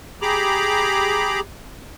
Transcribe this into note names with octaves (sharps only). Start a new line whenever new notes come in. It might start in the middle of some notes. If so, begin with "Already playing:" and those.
G4 G#4 A#5 B5 D6